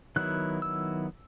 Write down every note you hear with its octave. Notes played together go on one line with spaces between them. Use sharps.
D#3 F#3 B3 E4 F#6
E6